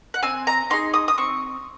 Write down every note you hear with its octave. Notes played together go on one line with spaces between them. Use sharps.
F#5
C4 G#5
A#5
D#4 G#4 C6
D#6
D#6
C4 C#6